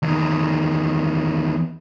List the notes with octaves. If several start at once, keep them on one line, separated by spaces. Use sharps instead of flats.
E2 D#3